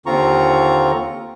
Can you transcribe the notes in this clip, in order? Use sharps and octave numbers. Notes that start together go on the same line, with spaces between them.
D#2 D3 C4 F4 A#5 C#6